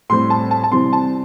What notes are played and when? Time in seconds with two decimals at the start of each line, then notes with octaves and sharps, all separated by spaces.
0.10 A2 G3 C4 C6
0.30 A5
0.51 A5
0.64 A5
0.72 C3 E3 G3 C4 C6
0.93 A5